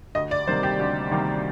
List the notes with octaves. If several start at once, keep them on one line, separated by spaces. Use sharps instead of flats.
D2 D#5
D5
C3 D#3 G3 A#3 C5
G4
D2
C3 D#3 G3 A#3